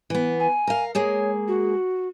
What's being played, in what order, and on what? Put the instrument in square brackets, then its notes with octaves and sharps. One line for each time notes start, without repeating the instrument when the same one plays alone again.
[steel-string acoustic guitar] E3 B3
[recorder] G#5
[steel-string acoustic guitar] A#4 F5
[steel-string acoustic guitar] G#3 A#3 G#4 [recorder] C#5
[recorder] F#4